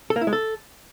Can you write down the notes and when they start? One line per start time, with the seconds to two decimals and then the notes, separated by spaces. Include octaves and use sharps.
0.10 A4
0.16 A#3
0.21 E4
0.27 G#3
0.33 A4